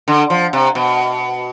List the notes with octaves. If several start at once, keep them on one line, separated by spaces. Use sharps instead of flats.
D3
F3
C3
B2